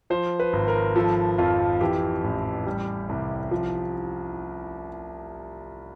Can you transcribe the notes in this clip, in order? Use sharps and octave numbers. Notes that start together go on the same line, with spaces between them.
F3 C5
B4
G#1
A#4
F3 A4
F2 F4
E3 G4
A1
G3
C2
F3